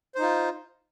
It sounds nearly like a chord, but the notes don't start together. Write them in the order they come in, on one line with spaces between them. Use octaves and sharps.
C5 D#4 F4